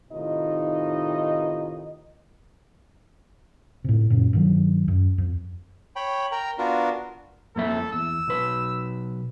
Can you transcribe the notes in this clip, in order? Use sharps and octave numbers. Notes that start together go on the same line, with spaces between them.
A2 C3 D#3 D#4 F4 D#5
A2 C3
F#2 A#2 C#3
G2 D#3 F#3
F#2
F2
C#5 G5 B5
A#4 G5 A#5
B3 D4 F4 F#4 A#4
F2 A#3 A4 E5
E2 E6
B1 B4